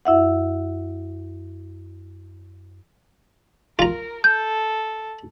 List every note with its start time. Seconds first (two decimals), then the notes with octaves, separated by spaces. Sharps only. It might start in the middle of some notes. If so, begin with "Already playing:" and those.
0.05 F#2 E4 E5 F#5
3.79 F4 A#4 A#5
4.24 A4 G6